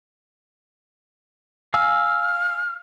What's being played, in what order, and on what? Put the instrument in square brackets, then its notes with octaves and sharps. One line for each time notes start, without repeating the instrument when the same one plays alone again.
[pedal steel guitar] F5 G#5 E6 [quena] F6